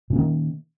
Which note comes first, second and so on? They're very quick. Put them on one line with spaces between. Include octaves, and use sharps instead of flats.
A#2 C#4 A#3 D#3